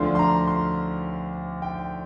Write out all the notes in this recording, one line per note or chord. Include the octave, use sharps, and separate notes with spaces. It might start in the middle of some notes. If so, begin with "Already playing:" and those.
Already playing: D2 D3 F3 D4 C6
C6
A#5
C6
G5